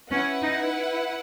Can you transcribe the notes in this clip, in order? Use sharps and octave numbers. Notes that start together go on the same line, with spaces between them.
C#4 E4 B4 F#5
D#4